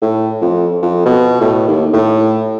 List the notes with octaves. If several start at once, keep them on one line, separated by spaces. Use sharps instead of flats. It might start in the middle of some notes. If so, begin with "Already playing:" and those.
A2
F2
F2
B2
A2
D#2
A2